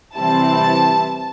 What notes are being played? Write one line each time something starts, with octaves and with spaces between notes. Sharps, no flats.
C3 E3 G3 C4 E4 A5